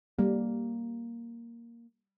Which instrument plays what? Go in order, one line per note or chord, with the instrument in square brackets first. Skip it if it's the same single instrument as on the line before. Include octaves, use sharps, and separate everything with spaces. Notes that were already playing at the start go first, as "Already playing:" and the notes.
[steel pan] G3 [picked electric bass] A#3